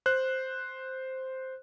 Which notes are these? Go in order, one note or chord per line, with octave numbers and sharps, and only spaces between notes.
C5 F#6